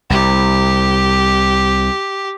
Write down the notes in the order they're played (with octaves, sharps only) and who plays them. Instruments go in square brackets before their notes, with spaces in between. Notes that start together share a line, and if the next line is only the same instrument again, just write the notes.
[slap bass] C2 [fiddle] G4